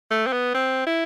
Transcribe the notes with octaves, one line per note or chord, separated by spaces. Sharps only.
A3
C4
B3
C4
E4